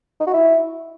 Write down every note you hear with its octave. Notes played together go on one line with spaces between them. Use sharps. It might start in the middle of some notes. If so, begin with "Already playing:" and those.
D#4
F#4
E4